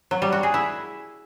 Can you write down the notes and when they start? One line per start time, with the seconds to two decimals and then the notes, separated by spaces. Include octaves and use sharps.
0.11 F#3
0.22 G3
0.32 F#4
0.43 G#4
0.54 E4